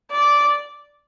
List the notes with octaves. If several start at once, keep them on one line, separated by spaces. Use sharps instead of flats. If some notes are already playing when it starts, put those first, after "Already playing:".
D5